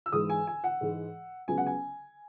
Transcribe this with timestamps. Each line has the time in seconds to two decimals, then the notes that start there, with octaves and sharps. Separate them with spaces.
0.06 E6
0.12 G#2 E3 G#3 D#6
0.29 G#5
0.47 G#5
0.64 F#5
0.81 G#2 E3 G#3
1.48 C#2 C#3 F#3 B3 G#5
1.57 F#5
1.66 G#5